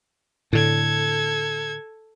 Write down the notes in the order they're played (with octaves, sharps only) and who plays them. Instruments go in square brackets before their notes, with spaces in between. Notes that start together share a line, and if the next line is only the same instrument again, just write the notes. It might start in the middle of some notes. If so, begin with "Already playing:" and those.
[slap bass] A2 D3 [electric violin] A4 G#6